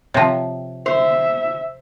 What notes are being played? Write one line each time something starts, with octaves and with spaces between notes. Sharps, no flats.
C3 F3 C#5 G5 A5
C5 E5